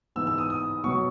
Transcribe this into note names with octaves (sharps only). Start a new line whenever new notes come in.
G#2 E3 B3 E6
E6
D#6
D#6
B2 F#3 B3 C#6